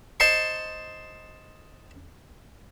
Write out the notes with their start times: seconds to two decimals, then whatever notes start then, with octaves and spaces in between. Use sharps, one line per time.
0.20 C5 D#5 A5 A#5 C6 C#6